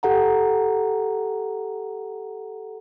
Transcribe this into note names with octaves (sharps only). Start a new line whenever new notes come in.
G4 A4 F#5 A#5